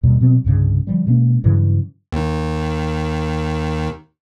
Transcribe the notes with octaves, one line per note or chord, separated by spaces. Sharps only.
D#2 B2 G3
B2 F#3 C4
C2 G2 C#3
D3 F3 G3
B2 G#3 A#3 C#4
G2 C#3 E3 F#3
D#2 D#3